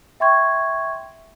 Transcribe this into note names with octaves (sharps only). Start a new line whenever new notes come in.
E5 G5 C6 C#6 G#6